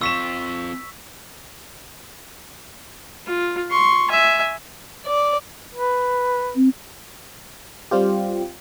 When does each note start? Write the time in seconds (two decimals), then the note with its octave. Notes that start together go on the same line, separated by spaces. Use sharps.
0.01 C4 F4 C#6 E6 B6 E7
3.27 F4
3.70 C6 C#6
4.10 E5 G#5
5.05 D5
5.75 B4
6.56 C4
7.91 G3 C4 F4 G4